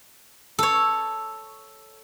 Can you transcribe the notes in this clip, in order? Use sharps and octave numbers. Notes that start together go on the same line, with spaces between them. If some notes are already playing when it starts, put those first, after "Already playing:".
A4 C#5